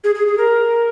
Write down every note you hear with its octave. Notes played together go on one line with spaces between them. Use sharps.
G#4
G#4
G#4
A#4